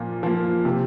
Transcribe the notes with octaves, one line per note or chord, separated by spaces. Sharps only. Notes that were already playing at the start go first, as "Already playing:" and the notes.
Already playing: A#2 F3 A#3
F3 A#3
C3